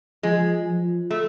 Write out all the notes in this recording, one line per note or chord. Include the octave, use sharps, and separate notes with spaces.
F3 G#3
F3
A3